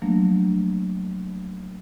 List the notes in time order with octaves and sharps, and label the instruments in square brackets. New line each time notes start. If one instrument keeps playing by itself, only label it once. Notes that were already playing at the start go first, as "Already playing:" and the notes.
[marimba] F3 F#3 A3 A#3 D4